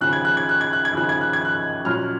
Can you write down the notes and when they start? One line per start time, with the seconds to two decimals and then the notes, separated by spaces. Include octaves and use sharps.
0.01 D#2 C#3 F3 F#6
0.13 G#6
0.25 F#6
0.37 G#6
0.49 F#6
0.61 G#6
0.73 F#6
0.85 G#6
0.93 D#2 C#3 F3 F#6
1.09 G#6
1.21 F#6
1.33 G#6
1.45 F#6
1.85 A#2 F#3 C#4 F6